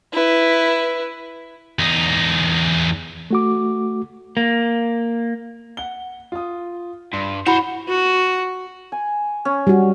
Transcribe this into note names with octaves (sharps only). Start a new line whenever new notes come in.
E4 B4
E2 D#4
A3 F#4 D6
A#3
F#5 G7
F4 D#6
G2 C6
E4 F#4 C5 C#5 B5
F#4
G#5
C#4
G3 F#4